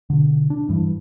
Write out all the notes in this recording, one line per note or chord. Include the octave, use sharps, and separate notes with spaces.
B2 D3
D4
G2 E3